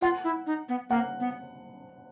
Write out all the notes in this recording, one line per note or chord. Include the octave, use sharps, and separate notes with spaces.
F4 F#5
E4
D#4
B3
A#3 F#5
B3